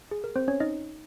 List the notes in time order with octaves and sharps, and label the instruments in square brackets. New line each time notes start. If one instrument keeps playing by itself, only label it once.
[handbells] G#4
A#4
C4 C5
C#4 C#5
D#4 D#5